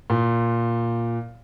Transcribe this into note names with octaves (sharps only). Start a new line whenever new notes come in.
A#2